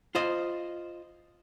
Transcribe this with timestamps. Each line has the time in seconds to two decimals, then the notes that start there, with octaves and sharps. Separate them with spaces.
0.15 F4 C5 D#5